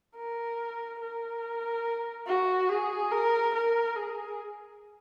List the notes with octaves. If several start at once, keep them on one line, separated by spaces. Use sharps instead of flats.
A#4
A#4
F#4
G#4
A#4
A#4
G#4